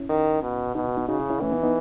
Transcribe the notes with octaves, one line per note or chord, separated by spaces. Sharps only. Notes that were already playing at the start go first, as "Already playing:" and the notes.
Already playing: C#4 E4
D#3
B2
B2 D#4 F#4
B3 D#4
C#3 D#4 F#4
C#4 E4
C#4 E4
E3 A3 C#4
B3 D#4
B3 D#4